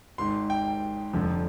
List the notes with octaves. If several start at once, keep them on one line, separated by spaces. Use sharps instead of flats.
G#1 G#2 D#3 C6
G5
F1 F2 D3 F3